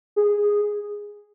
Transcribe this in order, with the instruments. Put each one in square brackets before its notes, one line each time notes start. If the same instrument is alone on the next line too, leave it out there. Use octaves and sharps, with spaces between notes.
[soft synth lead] G#4